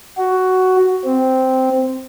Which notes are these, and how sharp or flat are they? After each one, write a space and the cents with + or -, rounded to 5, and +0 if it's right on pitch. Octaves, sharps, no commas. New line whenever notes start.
F#4 +10
C4 -5